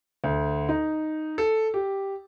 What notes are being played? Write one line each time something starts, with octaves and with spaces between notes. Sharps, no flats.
D2
D#4
A4
G4